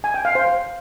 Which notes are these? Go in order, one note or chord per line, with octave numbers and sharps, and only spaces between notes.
G#5
G5
F5
C5